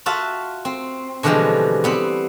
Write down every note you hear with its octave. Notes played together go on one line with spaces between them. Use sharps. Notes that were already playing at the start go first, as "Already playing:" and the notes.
F4 F#4 E5 A5
C4
B2 D3 E3 F3 G3 G#3
G3 B3 C4